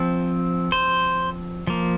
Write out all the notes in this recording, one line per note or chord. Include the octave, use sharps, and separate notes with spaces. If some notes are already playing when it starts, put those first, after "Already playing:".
Already playing: F3 C4
C5
F3 A#3